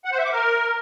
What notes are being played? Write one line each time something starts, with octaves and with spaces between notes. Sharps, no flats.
F#5
C5
E5
D6
A#4